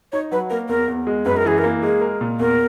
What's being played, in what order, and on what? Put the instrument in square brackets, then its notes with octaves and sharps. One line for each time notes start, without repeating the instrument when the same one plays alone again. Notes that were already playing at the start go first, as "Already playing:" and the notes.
[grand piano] D#4 [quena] C#5
[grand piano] F#3 [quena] B4
[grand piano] A#3 [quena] A#4
[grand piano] E2 [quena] A#4
[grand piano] E2
G#3
[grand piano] F#2 [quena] B4
[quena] A#4
[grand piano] E3 [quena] G#4
[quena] A#4
[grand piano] A#3
[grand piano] G#3 [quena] G#4
[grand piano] A#4
A#2
[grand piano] E2 [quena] A#4